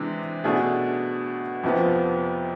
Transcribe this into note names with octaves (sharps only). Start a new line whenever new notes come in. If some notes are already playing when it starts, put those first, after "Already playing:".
Already playing: C3 E3 G#3 D4
B2 A3 D4 G#4
F2 C3 F3 B3